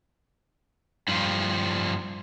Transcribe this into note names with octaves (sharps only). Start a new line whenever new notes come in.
G2 F3